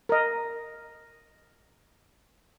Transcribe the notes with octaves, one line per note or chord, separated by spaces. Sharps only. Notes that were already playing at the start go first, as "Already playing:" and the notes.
A#4 D#5